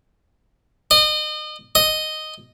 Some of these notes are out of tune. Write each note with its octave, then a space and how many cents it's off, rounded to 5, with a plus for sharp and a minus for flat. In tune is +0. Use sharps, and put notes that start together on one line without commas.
D#5 -35
D#5 -5